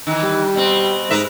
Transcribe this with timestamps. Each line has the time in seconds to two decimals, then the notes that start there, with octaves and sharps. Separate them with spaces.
0.07 D#3 E3
0.23 G3
0.55 B2 C4
1.11 G#2 A#4 B4 E5